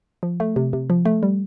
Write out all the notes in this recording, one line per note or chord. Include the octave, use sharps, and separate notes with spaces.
F3
A3
C3
C3
F3
A3
G3